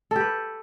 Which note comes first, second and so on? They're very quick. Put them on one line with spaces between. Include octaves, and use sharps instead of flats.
A4 G4 B4